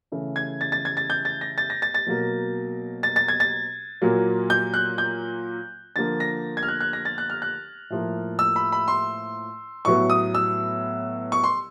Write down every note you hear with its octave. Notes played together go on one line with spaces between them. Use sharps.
C#3 E3 A3
G#6
A6
A6
G#6
A6
G6
A6
A#6
A6
A#6
A6
A6
B2 F#3 A#3
A6
A6
G#6
A6
A#2 F#3 A#3
G6
F#6
G6
D3 F3 A#3 A6
A#6
G#6
F6
F#6
F#6
A#6
A6
F#6
F6
F#6
A2 F3 A#3
E6
B5
B5
C6
A2 F#3 B3 C#6
D#6
E6
C#6
C6